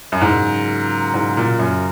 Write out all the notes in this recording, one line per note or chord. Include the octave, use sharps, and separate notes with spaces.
F#2
G#2 C#3 F#3 A#3 F4 A#4
G#2
A#2
F#2